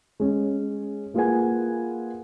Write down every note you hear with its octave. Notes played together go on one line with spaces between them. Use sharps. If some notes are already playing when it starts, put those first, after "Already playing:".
G#3 C#4
A#3 F4 G#4 B4 F#5 G#5